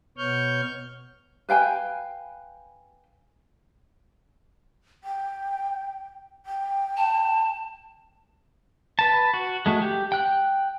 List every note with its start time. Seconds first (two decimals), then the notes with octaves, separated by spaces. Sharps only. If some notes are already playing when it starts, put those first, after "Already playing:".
0.17 B2 B3 C#5 C#6 F6 G6
1.49 B4 F5 G5 G#5
5.04 G5
6.46 G5
6.97 A5
8.99 B4 A5
9.34 F#4
9.66 G#3 A3 F#4
9.82 G4
10.12 G5 F#6